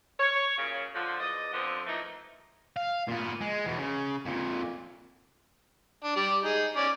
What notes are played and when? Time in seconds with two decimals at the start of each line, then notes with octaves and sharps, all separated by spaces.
0.20 C#5
0.58 F#2 A#2 C#3
0.95 D3 F3
1.20 E2 D5 D#5
1.53 D3 F3 B3 C4
1.86 E3 F3 A3 A#3 D#4
2.77 F5
3.08 A#2 B3
3.41 G#3
3.66 E2 B2
3.78 C#3
4.25 F2 A#2
6.04 D4
6.16 G3 D5
6.44 D#4 G#4
6.77 C#4 D5